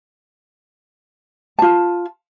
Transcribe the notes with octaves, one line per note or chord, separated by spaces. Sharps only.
F4 A5